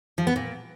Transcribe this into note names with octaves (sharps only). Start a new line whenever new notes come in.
F3
B3
A#2